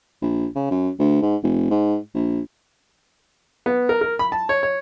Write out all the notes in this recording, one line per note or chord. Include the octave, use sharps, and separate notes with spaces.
A#1
C#3
F#2
D2
G#2
F1
G#2
A#1
B3
A#4
A#4
B5
A5
C#5
C#5